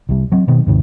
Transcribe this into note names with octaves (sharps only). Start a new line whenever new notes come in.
C2 G3
F#3 C4
B2 D#3 B3
D#2 G#2 C3 D#3